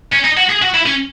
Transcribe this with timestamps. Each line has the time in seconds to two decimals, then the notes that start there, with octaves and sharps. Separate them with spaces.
0.13 C#4
0.24 D#4
0.37 F#4
0.49 G#4
0.62 F#4
0.74 E4
0.86 C#4